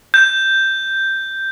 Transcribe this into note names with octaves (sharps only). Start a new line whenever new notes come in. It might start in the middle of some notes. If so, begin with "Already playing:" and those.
G6